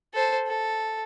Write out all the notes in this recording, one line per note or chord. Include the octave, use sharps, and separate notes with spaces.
A4 C5
A4